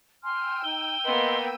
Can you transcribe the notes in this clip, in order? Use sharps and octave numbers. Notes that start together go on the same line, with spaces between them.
G5 G#5 C6 E6 F6 D#7
D#4 G7
A#3 B3 D#5 C6